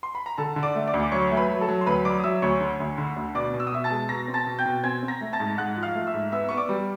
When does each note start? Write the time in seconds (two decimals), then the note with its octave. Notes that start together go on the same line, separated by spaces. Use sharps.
0.03 C6
0.15 B5
0.26 A#5
0.38 D3 A4 A5
0.56 D3
0.63 D5 D6
0.75 A3
0.87 D5 D6
0.94 D2
1.03 D6
1.12 F#3 C#5 C#6
1.31 A3
1.37 B4 B5
1.49 F#3
1.61 A4 A5
1.68 F#3
1.81 C6
1.86 D2 B4 B5
2.04 F#3 D5 D6
2.20 D#6
2.24 F#3 E5 E6
2.42 D2 C#5 C#6
2.61 D3
2.80 D2
2.98 D3
3.16 D2
3.35 B2 D5 D6
3.54 B2
3.60 E6
3.67 D#6
3.72 B2 E5 E6
3.84 A5 A6
3.90 G#3
4.09 B2 A#5 A#6
4.28 C4
4.34 A5 A6
4.46 B2
4.59 G5 G6
4.66 B2
4.83 C4 G#5 G#6
5.03 C4
5.08 A#5 A#6
5.21 A3
5.33 A5 A6
5.40 G#2
5.58 G#2 F#5 F#6
5.76 F3
5.83 F5 F6
5.95 A3
6.07 E5 E6
6.14 G#2
6.32 B3 E5 E6
6.49 B3 C#6
6.57 D5 D6
6.69 G3